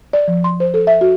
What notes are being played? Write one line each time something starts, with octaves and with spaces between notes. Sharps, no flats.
D5
F3
C6
C5
A4
E5
F#4